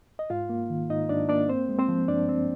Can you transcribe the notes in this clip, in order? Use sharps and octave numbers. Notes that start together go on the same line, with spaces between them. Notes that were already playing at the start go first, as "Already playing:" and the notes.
D#5
G#2 F4 F5
A#3
D#3
G#2 D#4 D#5
G#2 D4 D5
A#3 D4 D5
C4 C5
G#3
C4 C5
F3
G2 D4 D5
C4